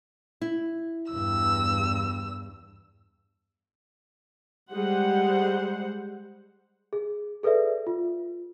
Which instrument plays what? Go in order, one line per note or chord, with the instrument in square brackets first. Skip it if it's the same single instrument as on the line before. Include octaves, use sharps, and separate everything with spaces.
[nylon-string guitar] E4
[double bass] E2 G2 [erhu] E6
[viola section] G3 G#3 C5 F#5
[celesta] G#4
G#4 A4 B4 D5 E5
F4